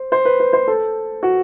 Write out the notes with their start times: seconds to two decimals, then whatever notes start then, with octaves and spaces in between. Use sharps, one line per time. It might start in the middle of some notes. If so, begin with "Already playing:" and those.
Already playing: C5
0.12 C5
0.25 B4
0.40 B4
0.53 C5
0.68 A4
1.23 F#4